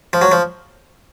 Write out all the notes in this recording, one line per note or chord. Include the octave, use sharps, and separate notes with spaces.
F3
F#3
F3